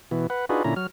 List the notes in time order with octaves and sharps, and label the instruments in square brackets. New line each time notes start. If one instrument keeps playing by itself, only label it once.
[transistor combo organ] B2 E3
B4 F#5
D4 D#4 F4 F#4 G#4 B4
A#2 D3 C#4 E4 A#5
F#3 F6